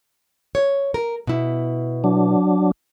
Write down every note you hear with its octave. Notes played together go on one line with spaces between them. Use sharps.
C#5
A#4
B2 E4
F#3 D4